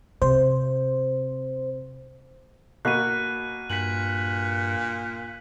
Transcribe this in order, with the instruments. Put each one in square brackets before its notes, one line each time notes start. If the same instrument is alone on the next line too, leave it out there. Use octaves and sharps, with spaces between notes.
[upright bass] C3 [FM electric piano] C5
[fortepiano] B2 A#3 F#4 [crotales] F#6 D#7
[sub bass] G2 [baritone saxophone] A#2 [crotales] B6 F#7